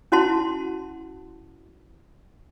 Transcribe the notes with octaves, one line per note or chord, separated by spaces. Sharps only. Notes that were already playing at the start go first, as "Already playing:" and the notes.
C#4 E4 F#4 F#5 A5 C6